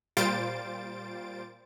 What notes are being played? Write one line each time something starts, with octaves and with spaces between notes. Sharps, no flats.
A#2 G3 F4 C5 A6 D7